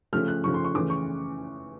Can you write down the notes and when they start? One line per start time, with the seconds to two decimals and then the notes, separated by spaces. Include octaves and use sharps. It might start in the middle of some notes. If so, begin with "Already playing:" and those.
0.13 C#3 F3 A3 F6
0.28 F#6
0.44 C#3 F3 A3 C#6
0.54 C6
0.65 C#6
0.75 C#3 E3 A3 D6
0.90 C#6